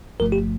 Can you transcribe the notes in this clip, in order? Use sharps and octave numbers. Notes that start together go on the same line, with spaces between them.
G1 G2 F3 A3 A#4
G4